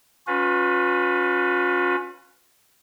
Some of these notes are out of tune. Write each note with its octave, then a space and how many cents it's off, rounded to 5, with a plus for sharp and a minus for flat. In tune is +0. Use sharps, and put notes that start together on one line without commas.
C#4 +0 F4 +45 B4 +10